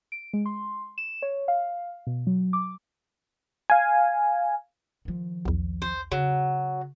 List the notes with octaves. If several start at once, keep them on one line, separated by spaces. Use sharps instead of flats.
D7
G#3
C6
E7
C#5
F5
B2
F#3
D6
F5 G#5
D#3 F3
B1 E2
C5
C#3 F#3